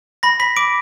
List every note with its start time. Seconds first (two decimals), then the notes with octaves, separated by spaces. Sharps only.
0.23 B5 A#6
0.40 B5 B6
0.56 D6 D7